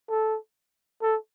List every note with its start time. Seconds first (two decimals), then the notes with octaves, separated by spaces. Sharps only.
0.09 A4
1.02 A4